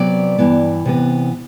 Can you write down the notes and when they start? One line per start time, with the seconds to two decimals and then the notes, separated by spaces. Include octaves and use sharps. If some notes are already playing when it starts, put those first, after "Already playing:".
Already playing: C3 F#3 B3 D5
0.38 G2 E3 B3
0.85 C3 E3 B3